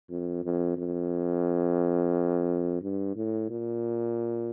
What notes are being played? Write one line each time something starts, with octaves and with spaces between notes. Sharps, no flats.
F2
F2
F2
G2
A2
A#2